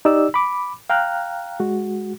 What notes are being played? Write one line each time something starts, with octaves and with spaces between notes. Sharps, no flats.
D#4 G4 D5 E6
B5 D6
F5 G5 A#5 F6 F#6
G#3 F#4